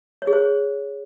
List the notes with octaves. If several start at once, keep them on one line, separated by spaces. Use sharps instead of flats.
C#5
G#4
C5